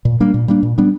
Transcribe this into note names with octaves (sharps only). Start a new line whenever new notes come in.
A#2
G3 A#3 D4
A#2
G3 A#3 D4
A#2
G3 B3 D4